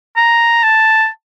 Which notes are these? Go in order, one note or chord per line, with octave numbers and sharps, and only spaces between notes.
A#5
A5